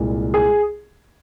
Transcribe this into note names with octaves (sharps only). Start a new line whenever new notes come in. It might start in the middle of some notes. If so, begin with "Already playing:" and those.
Already playing: C2 A#2 G#3
G#4